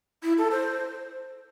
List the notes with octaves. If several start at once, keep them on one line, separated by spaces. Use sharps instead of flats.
E4
A4
C5